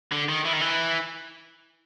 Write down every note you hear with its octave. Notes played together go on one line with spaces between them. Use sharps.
D3
D#3
E3
D#3
E3